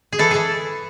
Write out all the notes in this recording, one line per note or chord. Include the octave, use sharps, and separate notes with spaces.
G#4
E3 A4
E3 G#4 A4